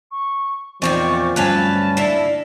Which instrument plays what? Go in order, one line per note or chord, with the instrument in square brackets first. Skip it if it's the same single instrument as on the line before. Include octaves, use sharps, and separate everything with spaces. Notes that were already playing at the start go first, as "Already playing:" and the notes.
[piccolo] C#6
[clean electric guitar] E2 C4 [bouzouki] A#2 D#3 D5 [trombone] F3 [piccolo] C#6
[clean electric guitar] D2 G2 [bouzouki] F#3 C#4 B4 [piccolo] A5
[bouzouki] A#3 E4 [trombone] D4